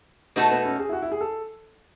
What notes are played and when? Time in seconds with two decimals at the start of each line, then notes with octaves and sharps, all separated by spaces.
0.36 B2 A3 B3 D#4 F#4 A4
0.51 B3
0.65 C#4
0.79 G#4
0.89 E4
0.93 F#4
1.02 E4
1.12 G#4
1.21 A4